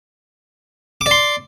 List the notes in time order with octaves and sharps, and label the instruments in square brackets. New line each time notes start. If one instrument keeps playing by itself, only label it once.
[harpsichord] D6
D5
C6